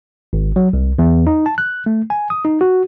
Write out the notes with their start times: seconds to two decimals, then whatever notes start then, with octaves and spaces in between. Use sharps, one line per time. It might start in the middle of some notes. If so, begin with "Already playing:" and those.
0.33 G#1
0.56 F#3
0.73 C2
0.99 E2
1.27 D#4
1.46 A5
1.58 F#6
1.86 A3
2.10 G#5
2.30 D#6
2.45 D#4
2.61 F#4